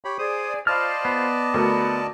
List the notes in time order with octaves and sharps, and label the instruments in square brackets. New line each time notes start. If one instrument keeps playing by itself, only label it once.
[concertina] G4 C#5 B5
[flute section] G#4 D5 [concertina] C5 D#6
[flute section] F4 C5 B5 [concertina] D5 D#5 A5 [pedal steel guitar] F6
[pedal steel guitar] B3
[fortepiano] D2 A#4 [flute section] F#4 B5